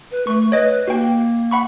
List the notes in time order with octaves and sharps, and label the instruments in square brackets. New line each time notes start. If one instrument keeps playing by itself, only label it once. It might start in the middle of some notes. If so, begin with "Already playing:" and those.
[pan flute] B4
[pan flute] A3 [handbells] C#6
[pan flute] B4 [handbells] C#5 D#5
[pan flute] A#3 [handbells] F#4 G5
[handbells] F#5 B5 C#6